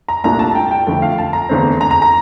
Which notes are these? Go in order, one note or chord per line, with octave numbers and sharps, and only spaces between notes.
A#5
C2 A#2 A3 D4 A#5
A5
A5
G5
G5
F2 D3 F3 A3 G5
F5
A5
A#5
E2 D3 A3 C4
A#5
A#5
A#5